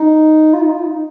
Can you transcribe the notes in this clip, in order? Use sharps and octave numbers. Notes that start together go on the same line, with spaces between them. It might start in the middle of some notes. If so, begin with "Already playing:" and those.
Already playing: D#4
F4
D#4
F4
D#4
D#4